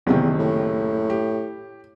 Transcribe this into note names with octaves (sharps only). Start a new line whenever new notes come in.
F#1 E2 C3 D#3
A2
G4